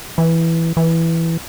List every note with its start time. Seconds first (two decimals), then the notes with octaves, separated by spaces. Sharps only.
0.18 E3
0.77 E3